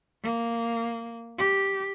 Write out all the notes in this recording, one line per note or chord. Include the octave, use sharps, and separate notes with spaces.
A#3
G4